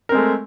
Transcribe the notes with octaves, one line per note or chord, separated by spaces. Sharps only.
G#3 A3 C4 A#4